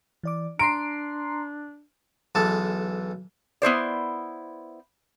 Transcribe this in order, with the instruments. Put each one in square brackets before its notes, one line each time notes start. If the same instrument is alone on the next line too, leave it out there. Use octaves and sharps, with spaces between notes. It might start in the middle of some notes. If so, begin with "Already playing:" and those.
[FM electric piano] E3 D5 D6
[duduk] D4 [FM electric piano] A#5 C6 C7 [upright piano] D7
[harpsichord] B1 E3 G#3 A4 A5
[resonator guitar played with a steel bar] B3 E4 C5 D5